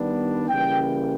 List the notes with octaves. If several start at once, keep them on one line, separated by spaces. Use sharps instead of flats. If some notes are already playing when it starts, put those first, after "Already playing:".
Already playing: D#3 G3 B3 D4
C#3 E3 G3 A#3 G5